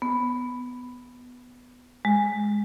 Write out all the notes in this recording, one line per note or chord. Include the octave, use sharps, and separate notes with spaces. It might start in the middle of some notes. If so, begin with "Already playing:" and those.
B3
G#3